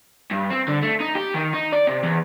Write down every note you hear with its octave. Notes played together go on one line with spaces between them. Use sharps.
G2
C4
D3
A3
D#4
G4
D#3
D#4
D5
C3
E2